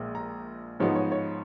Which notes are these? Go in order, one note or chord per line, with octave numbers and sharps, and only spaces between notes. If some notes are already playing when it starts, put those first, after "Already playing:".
Already playing: A#1 A#2 F3 G#3
A#5
G#2 F3 B3 D#4 C#5
C#5
C#5